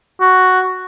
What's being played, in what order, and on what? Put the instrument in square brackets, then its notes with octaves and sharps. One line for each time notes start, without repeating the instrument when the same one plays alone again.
[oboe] F#4